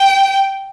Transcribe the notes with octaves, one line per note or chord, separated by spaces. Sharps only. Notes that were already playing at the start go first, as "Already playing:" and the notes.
Already playing: G5